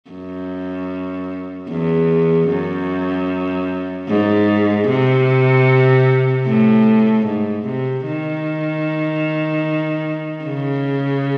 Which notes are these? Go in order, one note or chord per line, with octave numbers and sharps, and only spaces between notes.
F#2
E2
F#2
G#2
C3
A2
G#2
C3
D#3
C#3